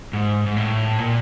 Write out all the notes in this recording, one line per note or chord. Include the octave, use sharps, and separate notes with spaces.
G#2
G#2
A2
A#2